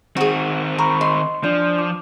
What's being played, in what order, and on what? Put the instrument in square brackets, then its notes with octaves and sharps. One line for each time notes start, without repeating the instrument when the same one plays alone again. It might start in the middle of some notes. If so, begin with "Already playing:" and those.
[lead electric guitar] D#3 C4 [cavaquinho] F#4 G#4
[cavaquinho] A#4 [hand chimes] B5 C#6
[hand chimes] D#5 [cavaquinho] C6
[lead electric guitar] F3 [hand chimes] D4 D5 G6
[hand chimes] D6